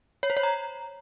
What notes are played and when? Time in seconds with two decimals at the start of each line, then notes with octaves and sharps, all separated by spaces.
0.23 C#5
0.30 C5
0.37 C#5
0.43 A#5